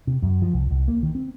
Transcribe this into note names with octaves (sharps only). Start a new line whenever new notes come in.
C3
F#2
F3
C2
C2
A#3
D#3
C4